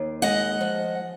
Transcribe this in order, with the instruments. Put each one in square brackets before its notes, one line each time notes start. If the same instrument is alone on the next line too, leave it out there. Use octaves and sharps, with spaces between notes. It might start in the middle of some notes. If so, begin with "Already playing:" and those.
Already playing: [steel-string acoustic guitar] D#2
G#3 D#5 F#5
F3